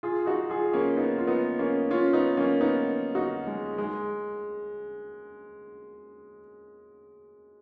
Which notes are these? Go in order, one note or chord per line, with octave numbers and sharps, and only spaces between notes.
F4 G#4
D#4 F#4
F4 G#4
A#3 C#4
B3 D#4
F4
B3 D#4
A#3 C#4
C#4 F4
B3 D#4
A#3 C#4
B3 D#4
D#4 F#4
G#3
G#3